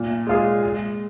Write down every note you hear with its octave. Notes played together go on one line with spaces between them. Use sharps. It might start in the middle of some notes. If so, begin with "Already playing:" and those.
Already playing: A#2
G#3 F4 G#4
G#3